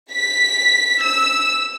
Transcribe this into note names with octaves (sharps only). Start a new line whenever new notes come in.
B6
E6